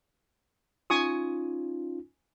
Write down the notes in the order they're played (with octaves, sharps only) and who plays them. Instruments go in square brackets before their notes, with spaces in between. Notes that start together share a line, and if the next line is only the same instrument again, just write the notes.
[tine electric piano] C#4 D#4 F4 [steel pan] G#5 C#6 D#6